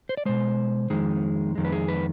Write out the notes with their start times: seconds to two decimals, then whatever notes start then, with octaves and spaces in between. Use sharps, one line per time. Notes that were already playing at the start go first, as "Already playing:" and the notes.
0.09 C5
0.17 D5
0.25 B2 G#3 C5
0.90 F2 D#3 G#3
1.55 F2 D#3 G#3
1.65 B4
1.72 G#4
1.88 B4